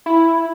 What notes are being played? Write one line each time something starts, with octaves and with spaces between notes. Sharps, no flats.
E4